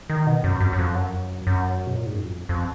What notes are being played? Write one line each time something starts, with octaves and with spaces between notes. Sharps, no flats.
D#3
B2
F#2
F#2
F#2
F2
F#2
F#2
B2
A#2
G#2
F#2
F2
F2